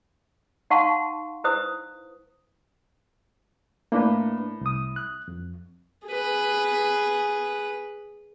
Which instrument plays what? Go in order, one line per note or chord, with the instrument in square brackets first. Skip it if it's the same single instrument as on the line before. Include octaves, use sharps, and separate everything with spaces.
[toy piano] D#4 F5 F#5 A5 C6 C#6
E4 B4 C5 D#6
[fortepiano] A2 [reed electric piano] A#3 D4 B4
[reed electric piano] C2 D#6
F#6
F2
[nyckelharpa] G#4 B4